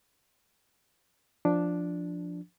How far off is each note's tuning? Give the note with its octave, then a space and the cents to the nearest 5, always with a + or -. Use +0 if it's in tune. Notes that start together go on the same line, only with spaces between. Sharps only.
F3 +0 D4 +0